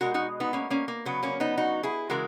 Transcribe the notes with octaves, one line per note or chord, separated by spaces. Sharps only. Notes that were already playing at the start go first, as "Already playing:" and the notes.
B2 G#3 F#4 A#4
D#4 F#4
B3 D#4
A#3 C#4
A#3 C#4
A#3
C#3 F#3 B3
A#3 C#4
B3 D#4
D#4 F#4
E4 G#4
C#3 E3 G#3 F#4 A#4